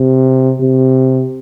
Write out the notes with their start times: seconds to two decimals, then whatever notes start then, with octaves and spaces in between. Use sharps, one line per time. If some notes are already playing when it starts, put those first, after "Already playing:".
Already playing: C3
0.61 C3